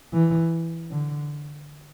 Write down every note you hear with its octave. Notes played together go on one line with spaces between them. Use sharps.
E3
D3